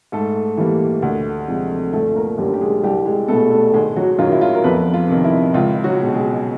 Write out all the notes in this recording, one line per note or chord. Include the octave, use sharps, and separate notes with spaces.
G#2 A3 A4
E3 G3 A#3
D2
C3 F3 G#3
G1 A3 A4
A#3 A#4
F#2 D3 G3 G4
G4
G#3 G#4
C2 G3 G4
G#3 G#4
B2 G3 A3 B3 A4
A3 A4
G#1 G#3 G#4
F#3 F#4
F#2 D#3 F#3 F4
E4
F4
A#4
F2 B3 B4
F4
C3 D#3
E4
C#2 F4
F#3 F#4
B2 G#3
G#3 G#4